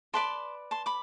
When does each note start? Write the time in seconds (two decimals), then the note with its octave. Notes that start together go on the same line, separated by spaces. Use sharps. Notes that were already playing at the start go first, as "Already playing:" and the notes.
0.13 G4 B4 D5 A5 C6
0.71 A5 C6
0.86 B5 D6